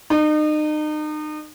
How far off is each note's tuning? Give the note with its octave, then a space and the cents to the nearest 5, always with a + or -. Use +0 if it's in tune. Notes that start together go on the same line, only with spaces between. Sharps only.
D#4 -35